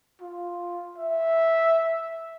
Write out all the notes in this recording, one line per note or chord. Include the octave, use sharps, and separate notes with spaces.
F4
E5